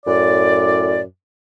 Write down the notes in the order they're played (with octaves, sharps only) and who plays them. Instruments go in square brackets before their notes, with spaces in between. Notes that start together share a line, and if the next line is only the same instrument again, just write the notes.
[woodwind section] F#2 A2 D5